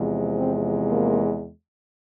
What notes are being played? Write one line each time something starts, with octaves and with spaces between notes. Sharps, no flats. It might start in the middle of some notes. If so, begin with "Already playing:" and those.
Already playing: E2 C3 F3 G#3
C4
A#3